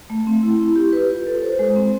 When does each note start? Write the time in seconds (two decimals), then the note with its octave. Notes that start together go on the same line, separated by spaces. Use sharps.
0.10 A3
0.27 C4
0.43 E4
0.60 E4
0.76 G4
0.93 B4
1.09 F4
1.27 A4
1.43 C5
1.59 G#3
1.76 C4